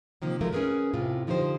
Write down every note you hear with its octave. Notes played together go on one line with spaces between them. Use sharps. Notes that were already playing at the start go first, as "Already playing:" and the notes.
C3 D#3 F3 A#3
F3 F#3 G#3 A3 F4 A#4
C#4 D#4 G#4 A#4 B4
A2 C3 F4
D3 F3 D#4 G4 C5